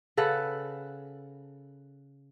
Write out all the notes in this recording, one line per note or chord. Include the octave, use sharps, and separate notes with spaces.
C#3 A4 B4 F#5